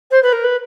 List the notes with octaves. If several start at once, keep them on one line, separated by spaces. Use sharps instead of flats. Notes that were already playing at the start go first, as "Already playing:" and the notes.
C5
B4
A#4
B4